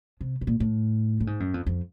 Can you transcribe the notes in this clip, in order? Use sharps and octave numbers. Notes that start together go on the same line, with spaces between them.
C3
B2
A#2
A2
A2
G#2
F#2
F2
F2